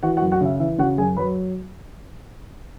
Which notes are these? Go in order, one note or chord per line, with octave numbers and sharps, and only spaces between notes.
E3 F#4 F#5
F#4 F#5
F#2
F#4 F#5
C#3 E5
E3 E5
C#3 F#4 F#5
F#2 G#4 G#5
F#3 B4 B5